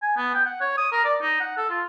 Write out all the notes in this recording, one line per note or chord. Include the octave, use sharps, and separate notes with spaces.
G#5
B3
G5
F#5
C#5
D#6
A#4
D5
D#4
F#5
A4
F4